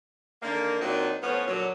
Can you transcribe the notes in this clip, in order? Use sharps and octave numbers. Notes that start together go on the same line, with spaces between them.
D3 D#3 A#3
A#2 F#3 C4 D4 D#4
A2 F3 B3 C#4 C#5
A#2 D3 F#3